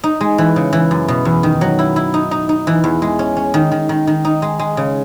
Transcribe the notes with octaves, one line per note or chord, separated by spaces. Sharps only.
D#4
G#3
E3
C#3
E3
F#2
B2
E2
D#3
F#3
E4
E4
D#4
D#4
D#4
E3
E2
G#3
C#4
C#4
D#3
D#3
D#3
D#3
D#4
G#3
G#3
C#3